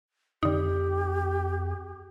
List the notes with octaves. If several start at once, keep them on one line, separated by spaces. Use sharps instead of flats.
F2 D3 D#4 G4